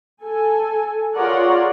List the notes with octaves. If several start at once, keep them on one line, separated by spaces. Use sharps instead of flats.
A4 G#5
F4 G#4 A#4 C#5 D5 F#5